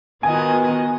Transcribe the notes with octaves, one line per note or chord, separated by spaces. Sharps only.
D#3 B3 F4 F#4 D#5 G#5